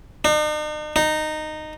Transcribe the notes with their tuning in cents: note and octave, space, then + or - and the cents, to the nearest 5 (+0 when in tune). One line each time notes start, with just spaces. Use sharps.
D#4 -45
D#4 -15